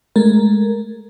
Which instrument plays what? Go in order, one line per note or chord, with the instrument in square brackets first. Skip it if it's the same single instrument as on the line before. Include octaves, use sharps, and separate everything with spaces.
[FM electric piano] G#3 A3 A#4